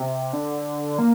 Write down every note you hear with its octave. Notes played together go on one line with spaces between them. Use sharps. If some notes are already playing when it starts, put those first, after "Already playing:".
Already playing: C3
D3
A#3